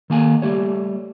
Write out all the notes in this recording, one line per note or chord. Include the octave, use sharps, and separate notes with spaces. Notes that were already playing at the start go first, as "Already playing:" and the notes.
D#3 A#3 G#5
G3 A3 G4 C#5